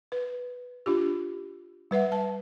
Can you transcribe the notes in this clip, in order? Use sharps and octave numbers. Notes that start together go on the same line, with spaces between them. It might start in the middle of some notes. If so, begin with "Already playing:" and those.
B4
D4 F4 G4
G3 B4 E5 F#5
A5